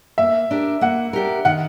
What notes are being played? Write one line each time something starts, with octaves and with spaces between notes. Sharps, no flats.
A#3 E5
D4 G4 A#4
A#3 F#5
D4 G4 A#4
D#3 F#5